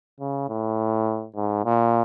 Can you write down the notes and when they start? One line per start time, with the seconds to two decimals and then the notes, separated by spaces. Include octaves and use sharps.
0.20 C#3
0.49 A2
1.36 G#2
1.64 A#2